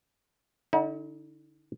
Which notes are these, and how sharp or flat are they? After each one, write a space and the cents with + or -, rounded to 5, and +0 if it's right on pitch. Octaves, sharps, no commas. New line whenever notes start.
D3 +0 D#4 +45